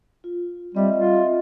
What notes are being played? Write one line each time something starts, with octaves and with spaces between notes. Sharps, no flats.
F4
G3 C4 D#5 E5
F4